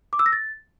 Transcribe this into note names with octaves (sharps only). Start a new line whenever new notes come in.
D6
E6
A#6
A6